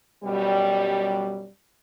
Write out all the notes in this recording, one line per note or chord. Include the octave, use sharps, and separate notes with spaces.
F#2 B2 G3